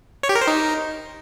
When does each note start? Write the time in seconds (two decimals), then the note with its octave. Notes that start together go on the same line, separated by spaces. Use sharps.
0.23 C#5
0.29 G4
0.35 A#4
0.41 C5
0.47 D#4